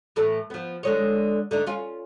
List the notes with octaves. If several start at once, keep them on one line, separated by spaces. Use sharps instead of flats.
A2 E3 A3
F3 B3
D3 G#3 C#5
D3 A3 D#4
C#4 F4